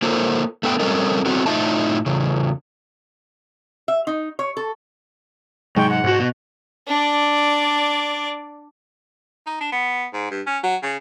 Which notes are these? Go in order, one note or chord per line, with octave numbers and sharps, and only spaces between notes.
A#3 F4 A4 A#4 C5
A3 B3 A4 G5
G3 C4 C#4 A4 A#4 D#5
B3 C4 F#4 A4
A2 D#4 F4 D#5 E5 A5
E2 C#3
E5
D#4
C#5
A4
G#2 C3 F#3 G#3 G5 C#6
F#5
B1 G#2 F#4
B2 B3
D4 D5
D#4
D4
B3
G#2
G2
C#4
F#3
C#3